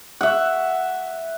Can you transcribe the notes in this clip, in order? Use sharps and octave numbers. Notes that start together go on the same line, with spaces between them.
E5 F#5